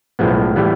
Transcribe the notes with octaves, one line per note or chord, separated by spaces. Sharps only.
B1 A2 F3 G#3 B3
A2 E3 G3 B3